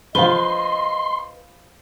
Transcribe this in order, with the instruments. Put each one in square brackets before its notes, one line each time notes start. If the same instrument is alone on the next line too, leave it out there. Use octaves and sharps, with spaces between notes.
[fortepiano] F3 F4 [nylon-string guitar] B4 [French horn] D#5 [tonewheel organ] C6